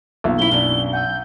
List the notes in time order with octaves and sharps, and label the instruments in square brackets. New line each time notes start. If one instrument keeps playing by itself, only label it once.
[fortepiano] B1 [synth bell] A#3 F4
[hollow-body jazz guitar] F#2 C#4 E4 [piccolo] G7
[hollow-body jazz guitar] F#2 B2 D4 [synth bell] A#3 C#4 E4
[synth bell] F#5 G#5 E6 [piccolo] G6